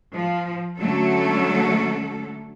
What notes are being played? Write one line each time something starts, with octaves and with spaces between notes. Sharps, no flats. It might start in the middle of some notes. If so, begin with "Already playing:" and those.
F3
D3 F#3 A3 C#4 A4